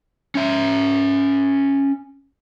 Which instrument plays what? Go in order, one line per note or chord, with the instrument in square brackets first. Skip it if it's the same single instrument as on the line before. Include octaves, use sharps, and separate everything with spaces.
[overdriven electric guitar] C#4 E5